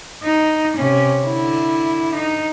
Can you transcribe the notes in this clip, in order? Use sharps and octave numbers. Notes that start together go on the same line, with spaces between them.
D#4
C3 C#4
D3 E4
D#4